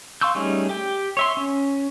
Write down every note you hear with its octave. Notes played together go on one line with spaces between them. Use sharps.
F5 C6 C#6 E6 G6
G3 A3 C#4 D#4 G#4
G4 G5
C#5 E5 C6
C#4